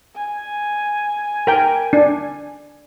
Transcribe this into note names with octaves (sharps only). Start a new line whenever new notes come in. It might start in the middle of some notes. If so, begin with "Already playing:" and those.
G#5
A#4 G5
D4